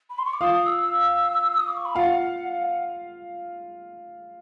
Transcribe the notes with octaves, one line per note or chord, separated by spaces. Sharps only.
B5
C6
C#6
D6
F4 F5 D#6
D#6
E6
E6
D#6
D6
C#6
B5
F4 F5 F#5